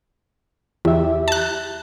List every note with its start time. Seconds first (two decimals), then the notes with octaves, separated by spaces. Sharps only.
0.85 E2 G4 E5
1.28 A5 F#6